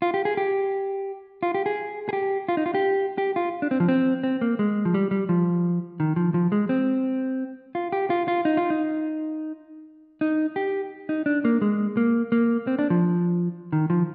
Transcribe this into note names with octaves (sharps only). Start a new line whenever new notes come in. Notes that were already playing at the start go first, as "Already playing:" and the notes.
F4
G4
G#4
G4
F4
G4
G#4
G#4
G4
F4
D#4
F4
G4
G4
F4
D4
C4
F3
C4
C4
A#3
G#3
F3
G3
G3
F3
D#3
F3
F3
G#3
C4
F4
G4
F4
F4
D#4
F4
D#4
D#4
G4
D#4
D4
A#3
G#3
A#3
A#3
C4
D4
F3
D#3
F3